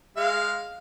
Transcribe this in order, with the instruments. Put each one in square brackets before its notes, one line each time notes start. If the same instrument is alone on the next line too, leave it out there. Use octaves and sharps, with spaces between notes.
[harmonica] G#3 F5